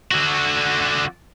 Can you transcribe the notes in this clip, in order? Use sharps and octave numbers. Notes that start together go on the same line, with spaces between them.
D3 F#4